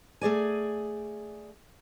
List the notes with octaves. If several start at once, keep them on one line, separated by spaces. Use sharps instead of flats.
A3 G#4 D5 G#5